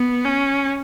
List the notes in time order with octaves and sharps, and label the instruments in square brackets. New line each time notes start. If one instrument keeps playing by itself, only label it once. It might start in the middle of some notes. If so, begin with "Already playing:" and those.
Already playing: [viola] B3
C#4